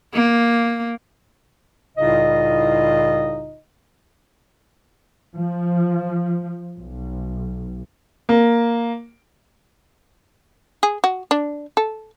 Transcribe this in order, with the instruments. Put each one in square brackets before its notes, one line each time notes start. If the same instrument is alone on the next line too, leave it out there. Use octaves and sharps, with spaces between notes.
[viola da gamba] A#3
[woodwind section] C2 A2 C#3 D#4 F4 D#5
[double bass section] F3
B1
[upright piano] A#3
[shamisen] G#4
F#4
D4
A4